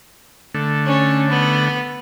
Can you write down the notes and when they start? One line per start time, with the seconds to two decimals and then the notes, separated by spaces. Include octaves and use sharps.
0.54 D3 A3
0.86 C#4
1.29 B3